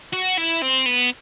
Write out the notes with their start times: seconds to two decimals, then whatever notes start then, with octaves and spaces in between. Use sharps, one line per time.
0.13 F#4
0.37 E4
0.62 C4
0.86 B3